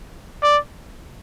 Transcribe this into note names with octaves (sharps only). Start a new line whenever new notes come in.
D5